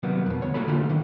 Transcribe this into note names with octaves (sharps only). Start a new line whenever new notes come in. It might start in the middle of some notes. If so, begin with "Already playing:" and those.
C3 D#3 F#3 G3 A#3 B3
F2 B2
D2 C#5
A3 A#3 F#4 A4 C#5 B5
D3 G3 A3 A#3 F4
D3 D#3